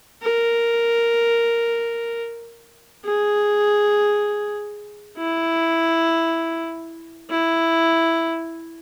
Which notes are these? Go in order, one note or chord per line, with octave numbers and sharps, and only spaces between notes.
A#4
G#4
E4
E4